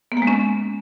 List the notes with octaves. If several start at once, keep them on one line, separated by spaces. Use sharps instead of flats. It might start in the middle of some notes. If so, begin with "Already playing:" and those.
B3
A#3
G#3
C#4